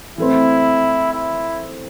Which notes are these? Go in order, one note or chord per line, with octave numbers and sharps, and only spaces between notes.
E3 A3 C4 E4
E4